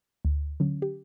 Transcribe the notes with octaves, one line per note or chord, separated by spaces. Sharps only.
D2
D3 F#3 C#4
G4